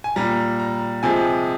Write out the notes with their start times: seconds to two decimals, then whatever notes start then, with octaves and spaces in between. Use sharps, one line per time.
0.04 G#5
0.16 A#2 G3 A#5
0.59 A#5
1.03 C3 F3 G#3 G#5